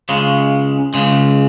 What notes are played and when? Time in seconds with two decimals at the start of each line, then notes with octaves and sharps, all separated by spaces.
0.09 C#2 C#3 G#3
0.94 C#2 C#3 G#3